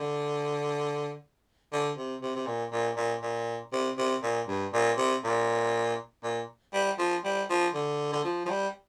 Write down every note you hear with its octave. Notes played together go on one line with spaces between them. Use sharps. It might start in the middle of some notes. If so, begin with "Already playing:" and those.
Already playing: D3
D3
C3
C3
C3
A#2
A#2
A#2
A#2
C3
C3
A#2
G2
A#2
C3
A#2
A#2
G3
F3
G3
F3
D3
D3
F3
F3
G3